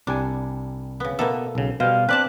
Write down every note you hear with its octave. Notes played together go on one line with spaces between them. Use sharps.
C2 G3 D4 G#5
C#3 B3
B2 A#3 B3 A4 E5
B1 C#3
B2 G3 C5 F5
C4 D4 B4 D5 A5 F#6